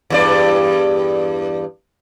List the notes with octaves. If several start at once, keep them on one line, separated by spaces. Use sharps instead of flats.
E2 G2 D5